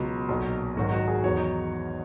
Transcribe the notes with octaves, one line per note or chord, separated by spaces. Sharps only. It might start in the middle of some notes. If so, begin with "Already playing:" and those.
Already playing: C#2 B2 F#3
B1 A#2 F#3
G#1 G#2 D#3 F#3 F#4
F#4
G#4
E2 D#3 F#3 C#5
D#4